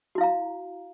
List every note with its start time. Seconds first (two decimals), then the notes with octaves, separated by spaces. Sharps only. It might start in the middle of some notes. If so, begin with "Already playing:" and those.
0.15 F#4
0.18 E4
0.21 F5
0.23 A#5